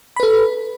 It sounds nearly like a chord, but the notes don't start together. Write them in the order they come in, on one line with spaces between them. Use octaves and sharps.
B5 B4 A4